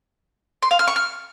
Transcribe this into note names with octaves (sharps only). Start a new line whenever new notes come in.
C6
F5
F6
C#6
F6